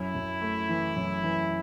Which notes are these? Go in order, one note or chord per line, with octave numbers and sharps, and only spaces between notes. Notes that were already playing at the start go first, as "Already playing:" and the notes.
Already playing: F#2 E4
F#2
A3
E3
F#2
E3